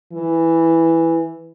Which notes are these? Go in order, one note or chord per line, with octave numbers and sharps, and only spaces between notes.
E3